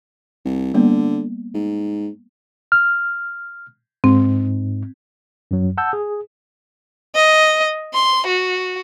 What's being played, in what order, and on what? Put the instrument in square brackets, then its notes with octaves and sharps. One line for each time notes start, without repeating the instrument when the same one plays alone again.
[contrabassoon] C2
[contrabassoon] D3 [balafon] G3 A#3 B3
[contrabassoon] G#2
[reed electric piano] F6
[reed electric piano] G#2 [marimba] C4
[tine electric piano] F#2 F#3
F#5 A5 E6 G6
G#4
[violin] D#5
C6
F#4